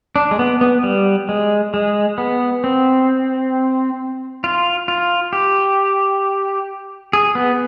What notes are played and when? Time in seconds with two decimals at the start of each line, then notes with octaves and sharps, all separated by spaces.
0.16 D4
0.31 G#3
0.39 B3
0.61 B3
0.83 G3
1.29 G#3
1.74 G#3
2.18 B3
2.64 C4
4.44 F4
4.88 F4
5.33 G4
7.13 G#4
7.35 B3